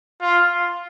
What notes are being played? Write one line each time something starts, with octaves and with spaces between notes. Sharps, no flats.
F4